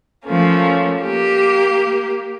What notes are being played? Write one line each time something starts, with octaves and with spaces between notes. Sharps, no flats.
F3 A3 A#3 C#4
A#3 G4